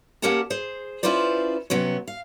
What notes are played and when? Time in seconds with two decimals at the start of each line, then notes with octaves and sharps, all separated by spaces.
0.22 A#3 C#4 G4 A#4 F#5 A5
0.50 G#4 C5
1.03 C#4 E4 F4 B4 C5 D5
1.70 C3 F#3 B3 C#4
2.08 F5